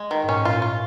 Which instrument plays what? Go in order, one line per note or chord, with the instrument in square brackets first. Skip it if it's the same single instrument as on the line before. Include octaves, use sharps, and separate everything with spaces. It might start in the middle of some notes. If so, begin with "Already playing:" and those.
Already playing: [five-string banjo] G#3
D#3
[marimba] G#2
[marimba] A#2 [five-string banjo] C#4
[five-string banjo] F4
F4